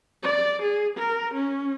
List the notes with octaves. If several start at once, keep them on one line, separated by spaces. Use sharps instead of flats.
D5
G#4
A#4
C#4